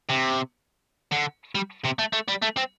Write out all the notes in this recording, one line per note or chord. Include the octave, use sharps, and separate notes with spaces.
C3
D3
G3
C3
A3
A3
G3
A3
C4